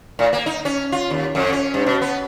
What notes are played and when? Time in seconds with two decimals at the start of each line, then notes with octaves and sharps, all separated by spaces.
0.19 A2
0.33 A#3
0.46 D#4
0.65 C#4
0.92 F4
1.10 D#2
1.35 F2
1.52 C#4
1.74 G2
1.86 B2
2.02 B3